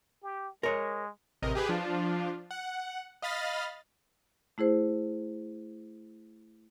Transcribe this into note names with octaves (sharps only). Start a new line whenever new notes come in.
G4
G#3 A#4 C#5
A1 C3 A#4 D#5
G4 G#4 B4
F3 D4 F4
F#5
D#5 F5 B5 F6 A6
A3 E4 G#4 C5